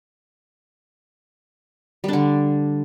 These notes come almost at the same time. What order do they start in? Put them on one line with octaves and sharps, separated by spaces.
G3 D4 D3